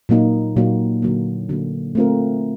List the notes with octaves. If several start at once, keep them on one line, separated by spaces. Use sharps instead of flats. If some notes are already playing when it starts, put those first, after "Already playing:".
A#2 F#3 A#3 D#4
A#2 F#3 A#3 D#4
D3 F#3 A#3
D3 F#3 A#3
A3 C4 F4 A#4